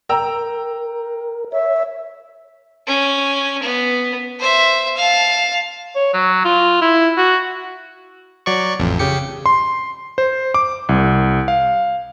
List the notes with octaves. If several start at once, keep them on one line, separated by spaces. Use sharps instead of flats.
A#4 G5 A#5 E6
C#5 E5
C#4
B3
C5 E5
F5 A5
C#5
F#3
F4
E4
F#4
F#3 D5 C#6
A1 F2
C#3 G4 C#7
C6
C5
D6
C2
F5